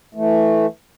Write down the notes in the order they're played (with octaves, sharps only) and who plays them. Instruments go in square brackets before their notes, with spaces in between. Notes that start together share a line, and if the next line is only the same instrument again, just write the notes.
[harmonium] E3 A3